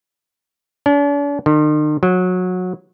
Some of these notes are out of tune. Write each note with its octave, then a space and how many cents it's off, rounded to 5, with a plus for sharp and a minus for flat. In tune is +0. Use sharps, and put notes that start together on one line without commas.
D4 -45
D#3 -45
F#3 -20